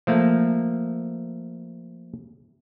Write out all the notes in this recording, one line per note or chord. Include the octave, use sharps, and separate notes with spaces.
F3 A3 A#3 F5